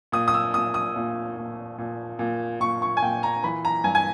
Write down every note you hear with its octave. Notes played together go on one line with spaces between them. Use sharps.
A#2 D#6
D#6
E6
A#2 D#6
D#6
A#2
A#2
A#2
A#2
A#2 C#6
C#6
G#5
A#2 G5
A#5
E3 B5
A#5
G2 G#5
G#5